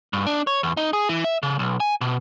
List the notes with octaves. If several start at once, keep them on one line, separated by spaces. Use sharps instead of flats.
G2
D4
C#5
E2
D#4
G#4
E3
E5
C#3
B1
G#5
B2